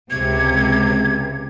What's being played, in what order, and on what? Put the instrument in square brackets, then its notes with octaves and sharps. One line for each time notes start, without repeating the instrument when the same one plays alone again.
[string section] C#2 C3 [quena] G#6